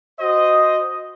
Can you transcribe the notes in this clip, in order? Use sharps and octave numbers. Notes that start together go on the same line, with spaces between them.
F#4 C5 D#5